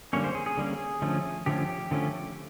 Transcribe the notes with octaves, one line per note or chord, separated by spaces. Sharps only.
D3 G3 A#3 C#4 C#5
C5
G#4
G#4
D3 G3 A#3 C#4
D3 F3 A3 C#4
D3 F3 A3 C#4 G4
D3 F3 A3 C#4